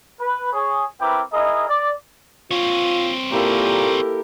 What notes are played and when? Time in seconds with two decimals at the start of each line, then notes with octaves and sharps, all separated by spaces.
0.20 B4
0.53 G#4 C#5
1.01 C4 E4 A#4 B4 G5 D6
1.33 E4 G#4 A#4 D#5
1.68 D5
2.51 C4 F4 C#5
3.32 A#2 A#3 E4 G4 A4 A#4